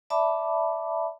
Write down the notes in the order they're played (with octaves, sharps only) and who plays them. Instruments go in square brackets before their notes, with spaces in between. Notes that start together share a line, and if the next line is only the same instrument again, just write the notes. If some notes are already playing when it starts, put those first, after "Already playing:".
[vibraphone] D5 E5 A5 B5 D6